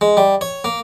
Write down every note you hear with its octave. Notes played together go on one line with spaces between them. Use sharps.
G#3
G3
C#5
A#3